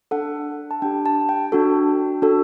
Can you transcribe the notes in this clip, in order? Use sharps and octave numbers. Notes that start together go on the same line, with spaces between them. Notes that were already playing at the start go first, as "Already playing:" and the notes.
D4 A4 F#5
A5
D4 G4 G5
A5
G5
D4 F#4 A4
D4 F#4 A4